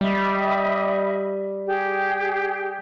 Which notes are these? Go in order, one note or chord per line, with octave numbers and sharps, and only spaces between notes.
G3 D#5 E5 B5
G4 G#4 G5